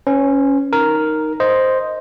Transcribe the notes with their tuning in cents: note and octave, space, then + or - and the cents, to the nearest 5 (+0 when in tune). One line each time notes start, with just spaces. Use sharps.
C#4 +0 B4 +40
D#4 +0 A#4 +0
C5 +0 D#5 +0